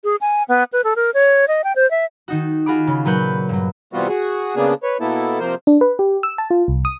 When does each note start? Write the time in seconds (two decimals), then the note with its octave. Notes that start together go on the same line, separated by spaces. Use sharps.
0.04 G#4
0.21 G#5
0.48 B3
0.73 B4
0.84 A4
0.96 A#4
1.14 C#5
1.48 D#5
1.64 G5
1.76 C5
1.91 E5
2.28 D#3 D#4 F#4
2.66 F4 F#4 G#4 B5 D6
2.87 C#3
3.05 A#2 F#3 B4 C#5 F#6 G6
3.49 G2 F#3
3.93 C3 E3 G3 B3 F4 F#4
4.08 F#4 G#4
4.56 C#3 A#3 B3 D4 G#4
4.83 B4 C#5
5.00 B2 A#3 B3 E4 A4
5.39 C3 F3 A#3 A#4 C5
5.67 D4
5.81 B4
5.99 G4
6.23 E6
6.38 A5
6.50 F4
6.68 C2
6.85 D#6